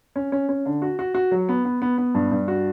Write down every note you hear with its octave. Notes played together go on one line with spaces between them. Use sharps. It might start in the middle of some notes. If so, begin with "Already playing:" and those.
C#4
C#4
C#4
D3
F#4
F#4
F#4
F#3
B3
B3
B3
B3
G2
G2
F#4